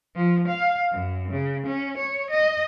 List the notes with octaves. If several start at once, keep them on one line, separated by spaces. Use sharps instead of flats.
F3
F5
F#2
C#3
C#4
C#5
D#5